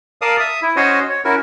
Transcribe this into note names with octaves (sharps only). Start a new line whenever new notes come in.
A#4 D5 F5 A5 D#6
E5 D#6
E4
C#4 F#4 C5 C#5 D#5
C#5
C#4 E4 F#4 A#4